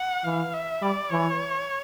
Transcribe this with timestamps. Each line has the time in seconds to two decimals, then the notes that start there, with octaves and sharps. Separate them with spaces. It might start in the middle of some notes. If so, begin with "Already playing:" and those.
Already playing: F#5
0.24 E3 F5
0.53 E5
0.82 G3 D5
1.11 E3 C#5